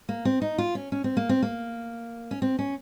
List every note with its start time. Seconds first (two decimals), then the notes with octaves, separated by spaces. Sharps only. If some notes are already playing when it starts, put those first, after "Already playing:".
0.09 A#3
0.25 C4
0.42 D#4
0.58 F4
0.75 C#4
0.92 C#4
1.04 C4
1.17 A#3
1.29 C4
1.42 A#3
2.31 C#4
2.42 C4
2.59 C#4